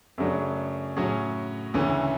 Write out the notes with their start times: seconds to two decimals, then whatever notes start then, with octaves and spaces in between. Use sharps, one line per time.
0.18 F#2 C#3 F#3 A3 D4
0.97 A2 F#3 C#4 G#4
1.74 D2 C#3 E3 A3 C#4